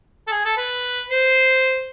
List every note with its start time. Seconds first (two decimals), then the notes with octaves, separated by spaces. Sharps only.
0.27 A4
0.31 G#4
0.45 A4
0.57 B4
1.10 C5